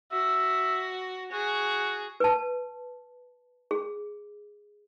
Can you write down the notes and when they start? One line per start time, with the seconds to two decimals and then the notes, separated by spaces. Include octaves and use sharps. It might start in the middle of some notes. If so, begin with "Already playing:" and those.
0.12 F#4 E5
1.32 F#4 G#4
2.20 B4 A5
3.71 G#4